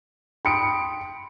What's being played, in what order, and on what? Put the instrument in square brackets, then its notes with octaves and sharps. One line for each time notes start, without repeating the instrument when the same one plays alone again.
[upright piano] G5 C#7 D7 [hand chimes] B5 C6 D#6